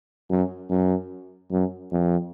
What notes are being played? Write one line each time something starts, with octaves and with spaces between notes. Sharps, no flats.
F#2
F#2
F#2
F2